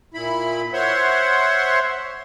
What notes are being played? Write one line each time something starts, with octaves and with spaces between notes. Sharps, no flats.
A#2 E4 B5
C5 C#5 E5 F#5 C6